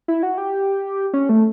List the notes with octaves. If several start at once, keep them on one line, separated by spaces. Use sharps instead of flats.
E4
F#4
G4
C#4
A3